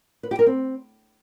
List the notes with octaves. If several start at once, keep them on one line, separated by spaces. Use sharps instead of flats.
B4
G4
A#4
C4